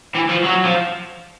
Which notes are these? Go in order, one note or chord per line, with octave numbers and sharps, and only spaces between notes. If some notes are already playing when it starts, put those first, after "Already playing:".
E3
F3
F#3
F3